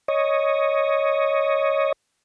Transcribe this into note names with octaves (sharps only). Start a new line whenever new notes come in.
C#5 D#5